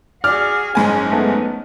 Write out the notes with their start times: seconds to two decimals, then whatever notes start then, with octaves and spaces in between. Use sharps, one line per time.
0.24 F#4 G#4 D5 F6
0.75 F#1 G#2 C#4 D#4 G#5
1.11 A3 B3